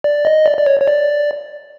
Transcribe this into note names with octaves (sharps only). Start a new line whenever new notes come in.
D5
D#5
D5
D5
C#5
C#5
D5